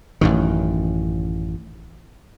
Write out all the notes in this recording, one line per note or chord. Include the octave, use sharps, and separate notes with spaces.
A1 F#2 D#3